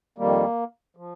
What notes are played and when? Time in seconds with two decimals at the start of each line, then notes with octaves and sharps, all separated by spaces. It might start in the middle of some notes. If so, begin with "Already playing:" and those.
0.18 F2 D#3 G3 A#3
0.97 F3